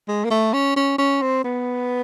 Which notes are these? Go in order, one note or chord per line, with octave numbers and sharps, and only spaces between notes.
G#3
A#3
A3
C#4
C#4
C#4
C4
B3